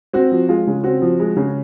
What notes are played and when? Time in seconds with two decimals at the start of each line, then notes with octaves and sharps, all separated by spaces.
0.13 C4 F#4
0.32 F3
0.49 G#3 F4
0.67 C#3
0.84 C4 F#4
1.02 F3
1.20 G#3
1.37 C#3